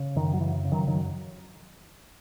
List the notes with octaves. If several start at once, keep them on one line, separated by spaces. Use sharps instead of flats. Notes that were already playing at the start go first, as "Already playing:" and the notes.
Already playing: C#3
F#2 D#3
F#3
C#3 E3
C#3
D#3 F#3
F#2 D#3 F#3